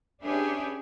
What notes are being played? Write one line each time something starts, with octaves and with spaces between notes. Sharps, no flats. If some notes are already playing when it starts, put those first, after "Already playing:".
C#4 D4 G4 G#4 B4 E5